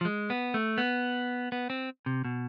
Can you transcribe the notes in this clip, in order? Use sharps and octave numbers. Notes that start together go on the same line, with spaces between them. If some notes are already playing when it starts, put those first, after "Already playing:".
F3
G#3
B3
A3
B3
B3
C4
C3
B2